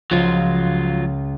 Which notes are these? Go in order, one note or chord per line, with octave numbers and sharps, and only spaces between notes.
C#2 F3 F#3 F4